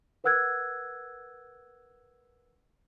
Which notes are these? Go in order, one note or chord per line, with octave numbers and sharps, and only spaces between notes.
A#4 B4 F#5 E6 F#6 G#6